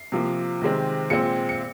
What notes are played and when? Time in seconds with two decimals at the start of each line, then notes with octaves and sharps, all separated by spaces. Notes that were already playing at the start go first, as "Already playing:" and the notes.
Already playing: C7
0.12 C3 F3 A#3
0.62 C3 D#3 G#3 C4
1.10 A#2 G#3 C4 C#7
1.49 C#7